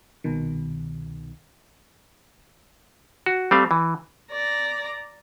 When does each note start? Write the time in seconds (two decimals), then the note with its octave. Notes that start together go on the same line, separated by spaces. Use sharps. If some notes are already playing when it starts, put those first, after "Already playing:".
0.24 C2 B2 D#3
3.26 F#4
3.51 G3 A3 C4 F5
3.71 E3
4.31 D5 A#5